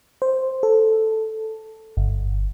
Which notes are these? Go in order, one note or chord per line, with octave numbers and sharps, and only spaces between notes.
C5
A4
G1